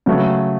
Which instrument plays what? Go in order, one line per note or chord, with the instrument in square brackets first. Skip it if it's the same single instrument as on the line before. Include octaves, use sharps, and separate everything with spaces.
[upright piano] C#3 F#3 A3